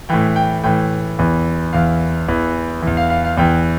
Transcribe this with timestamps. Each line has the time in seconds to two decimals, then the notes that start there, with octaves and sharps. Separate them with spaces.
0.09 A2 E3 G5
0.36 G5
0.64 A2 E3 G5
1.19 E2 E3
1.73 E2 E3 F5
2.28 E2 E3
2.82 E2 E3
2.97 F5
3.10 F5
3.24 F5
3.37 E2 E3 G5